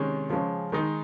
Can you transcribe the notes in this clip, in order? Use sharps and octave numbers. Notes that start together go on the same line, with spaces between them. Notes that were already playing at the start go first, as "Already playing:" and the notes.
Already playing: C3 D#3 G#3 C#4
C#3 F3 G#3 C#4
D#3 G#3 D#4